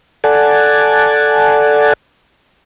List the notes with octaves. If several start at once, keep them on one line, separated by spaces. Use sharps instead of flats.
A4 D5 F#5 G#5 A5